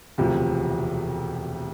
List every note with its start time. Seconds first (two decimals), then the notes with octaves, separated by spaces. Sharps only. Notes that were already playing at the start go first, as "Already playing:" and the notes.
0.18 E1 D2 C3 F3